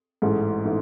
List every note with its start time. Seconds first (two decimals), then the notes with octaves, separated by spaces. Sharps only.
0.22 A1 G#2 E3 A3 G#4
0.65 E3 A3 D#4